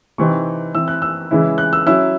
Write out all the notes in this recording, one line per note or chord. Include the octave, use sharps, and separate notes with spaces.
C3 E3 C4 D#4 C#6
E3 C4 E4 E6
F#6
E6
C#3 E3 G#3 C#4 E4
F#6
E6
F#3 C#4 E4 E6